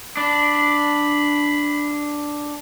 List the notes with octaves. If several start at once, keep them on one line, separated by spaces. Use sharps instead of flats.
D4 B5